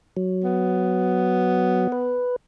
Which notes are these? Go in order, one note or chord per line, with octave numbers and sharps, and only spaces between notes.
F#3
B3
B4